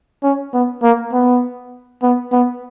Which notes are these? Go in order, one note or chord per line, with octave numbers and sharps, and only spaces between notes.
C#4
B3
A#3
B3
B3
B3